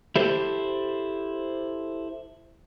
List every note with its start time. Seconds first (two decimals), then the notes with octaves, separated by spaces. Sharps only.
0.16 E4 G4 A4 C5